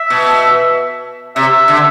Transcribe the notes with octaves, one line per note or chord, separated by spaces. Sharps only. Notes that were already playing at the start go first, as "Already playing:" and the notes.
Already playing: E5
B2
C3 E5
D3
E5